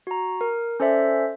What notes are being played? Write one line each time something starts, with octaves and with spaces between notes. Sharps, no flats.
F#4 A#5
A#4
C#4 A4 C5 D5 E5